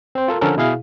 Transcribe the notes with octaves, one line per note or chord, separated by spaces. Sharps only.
C4 C5
F4 A4 A#4
D3 F3 C#4 A4 A#4
B2 E4 G#4 F5